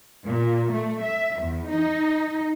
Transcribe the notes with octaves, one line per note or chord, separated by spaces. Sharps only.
A#2
A3
E5
E2
D#4